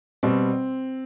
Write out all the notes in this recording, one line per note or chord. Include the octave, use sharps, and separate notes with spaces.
B2 G3 C4